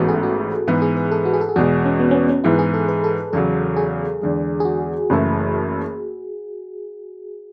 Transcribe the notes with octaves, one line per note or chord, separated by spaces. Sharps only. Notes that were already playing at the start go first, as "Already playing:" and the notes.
Already playing: A1 G#2 E3 B3 F#4 A4
G#4
F#4
G#2 E3 B3 G#4
G#4
B4
A4
F#4
G#4
A4
G#4
E2 B2 G#3 F#4
C#4
B3
C#4
B3
C#4
G#2 E3 B3 E4
G#4
A4
B4
A4
B4
E2 C#3 F#3 A4
G#4
E2 D3 G#3
G#4
F#4
F#1 F#2 E3 A3 E4